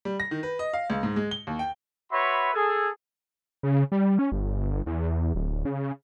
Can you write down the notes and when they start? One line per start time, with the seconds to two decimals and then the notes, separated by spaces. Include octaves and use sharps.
0.05 G3
0.20 A#6
0.31 D#3
0.43 B4
0.59 D#5
0.74 F5
0.90 C#2
1.03 G#2
1.16 G#3
1.31 G7
1.47 D#2
1.59 G5
2.12 F#4 B4 C#5 E5 B5 C6
2.54 G#4 A4
3.63 C#3
3.92 G3
4.19 C#4
4.32 G1
4.86 E2
5.35 D1
5.65 C#3